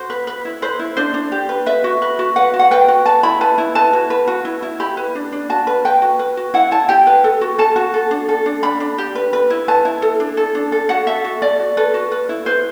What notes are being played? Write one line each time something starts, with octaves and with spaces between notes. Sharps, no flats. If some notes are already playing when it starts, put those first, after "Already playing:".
Already playing: F#4 C5
B4
B4
E4
B4 C5
E4
D4 C5
D4
G4
B4
B4 E5
F#4
B4
F#4
B4 F#5
F#4
F#5
B4 G5
F#4
B4 A5
E4 B5
B4 A5
E4
B4 A5
F#4
B4
F#4
E4
E4
G4 B5
B4
D4
D4
F#4 A5
B4
B4 G5
F#4
B4
F#4
E4 F#5
E4 A5
G4 G5
B4
A4
F#4
A4 A5
F#4
A4
D4
A4
D4
D4 B5
D4
G4
B4
B4
E4
B4 A5
E4
A4
D4
A4
D4
A4
F#4 F#5
A4 E5
F#4
A4 D5
F#4
A4 B4
F#4
B4
E4
B4 C5